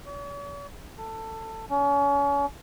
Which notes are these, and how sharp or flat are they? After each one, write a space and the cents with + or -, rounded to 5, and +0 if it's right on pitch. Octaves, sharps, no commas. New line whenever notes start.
C#5 +45
A4 +15
C#4 +35